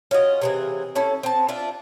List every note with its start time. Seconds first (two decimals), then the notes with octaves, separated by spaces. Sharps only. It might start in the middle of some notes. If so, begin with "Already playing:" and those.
0.11 C#4 F4 F#4 D#5
0.42 C3 E3 G#4
0.95 C#4 E4 A4
1.23 C4 A5
1.49 D4 F4 E5